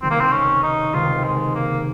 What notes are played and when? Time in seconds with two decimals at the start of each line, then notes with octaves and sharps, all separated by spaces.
0.02 C#2 C3 D#3 C4
0.10 A#3
0.20 C4
0.32 C#4
0.63 D#4
0.94 C#2 C3 D#3 F4
1.24 G#3
1.54 A#3